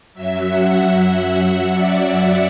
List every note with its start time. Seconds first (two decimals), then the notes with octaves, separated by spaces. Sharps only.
0.14 F#2 F#3 E5
0.45 F#5
1.40 E5
1.72 D5
2.03 E5